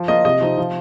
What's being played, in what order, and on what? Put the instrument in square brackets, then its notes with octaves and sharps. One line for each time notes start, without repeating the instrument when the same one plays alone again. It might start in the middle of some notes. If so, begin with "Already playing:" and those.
Already playing: [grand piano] F3
A#3 F4 D#5
C3 D#5
F3 C4 D#4
F3